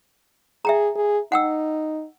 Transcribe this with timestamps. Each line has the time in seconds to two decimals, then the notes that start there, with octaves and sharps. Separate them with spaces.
0.65 G#4 E5 G5 A#5
0.96 G#4
1.32 D#4 F#5 G5 E6